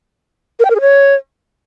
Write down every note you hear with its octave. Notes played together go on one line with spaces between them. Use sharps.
A#4
G5
A#4
G#4
C#5